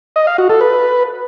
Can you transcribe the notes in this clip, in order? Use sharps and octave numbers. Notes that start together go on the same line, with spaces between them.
D#5
F5
F#4
A4
B4